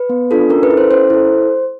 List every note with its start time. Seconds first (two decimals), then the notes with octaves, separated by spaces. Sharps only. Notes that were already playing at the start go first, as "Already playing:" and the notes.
Already playing: B4
0.09 B3
0.31 D4 F4 A4
0.50 C#4 A#4
0.63 B4
0.70 E4 A4
0.77 C5
0.91 C#4 C5
1.10 E4 A4